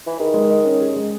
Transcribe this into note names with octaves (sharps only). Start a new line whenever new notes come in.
E3
D#3 G#4
G#3
D#5
C#4
G#4
G#3